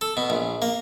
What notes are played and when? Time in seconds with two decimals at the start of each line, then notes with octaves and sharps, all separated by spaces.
0.01 A4
0.17 B2
0.30 A#1
0.62 A#3